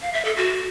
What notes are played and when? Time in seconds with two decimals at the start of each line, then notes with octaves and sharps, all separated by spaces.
0.01 F5
0.13 E5
0.25 A4
0.37 F#4